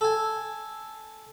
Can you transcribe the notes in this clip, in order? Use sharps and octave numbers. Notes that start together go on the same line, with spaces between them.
A4 G#5